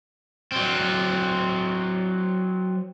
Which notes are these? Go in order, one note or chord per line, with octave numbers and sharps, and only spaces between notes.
F#3 C4